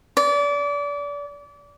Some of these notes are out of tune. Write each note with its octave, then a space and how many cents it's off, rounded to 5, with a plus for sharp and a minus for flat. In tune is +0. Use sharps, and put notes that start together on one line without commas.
D5 -30